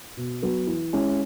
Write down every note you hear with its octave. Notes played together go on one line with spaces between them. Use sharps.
B2
F#3 B3
E3
G#3 C#4 E4